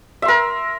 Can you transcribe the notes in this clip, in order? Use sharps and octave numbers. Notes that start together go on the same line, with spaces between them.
A#4 E5 C6